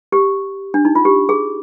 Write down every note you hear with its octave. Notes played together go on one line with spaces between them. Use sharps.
G4
D4
D#4
F4
G4
G#4